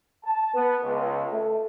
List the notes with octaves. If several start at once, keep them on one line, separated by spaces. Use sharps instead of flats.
A5
B3
C#2
A3